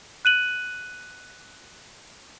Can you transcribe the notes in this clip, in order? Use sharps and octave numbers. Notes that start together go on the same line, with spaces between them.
F#6 D#7 F#7